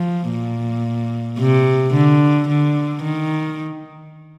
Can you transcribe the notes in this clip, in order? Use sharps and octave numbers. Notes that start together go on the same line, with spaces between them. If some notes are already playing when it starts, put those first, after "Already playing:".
Already playing: F3
A#2
C3
D3
D3
D#3